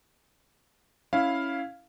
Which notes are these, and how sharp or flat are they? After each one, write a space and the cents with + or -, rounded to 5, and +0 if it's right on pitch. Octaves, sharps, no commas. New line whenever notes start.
C#4 +0 E4 +0 F5 +0